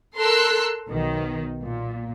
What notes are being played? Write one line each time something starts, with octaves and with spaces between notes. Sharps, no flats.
A4 A#4 C6 E6 F#6
B1 D#3
A#2